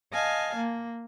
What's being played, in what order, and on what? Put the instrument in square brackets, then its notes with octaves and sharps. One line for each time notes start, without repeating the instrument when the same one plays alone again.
[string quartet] D#5 F5 G#5 A5
A#3